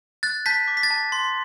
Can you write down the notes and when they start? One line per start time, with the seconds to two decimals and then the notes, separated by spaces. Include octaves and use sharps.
0.23 F#6 A6
0.46 A5 G6 B6
0.68 D6
0.77 B6
0.83 A6
0.90 A5
1.12 C6